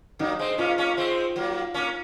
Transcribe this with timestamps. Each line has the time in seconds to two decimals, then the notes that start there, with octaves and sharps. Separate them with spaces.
0.19 F#3 A#3 D#4
0.39 G#3 C4
0.58 A#3 C#4 F4
0.78 A#3 C#4
0.97 G#3 C4
1.36 F#3 A#3
1.74 A#3 C#4